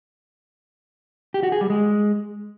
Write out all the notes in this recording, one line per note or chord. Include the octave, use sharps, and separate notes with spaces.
G4
F#4
G#4
G3
G#3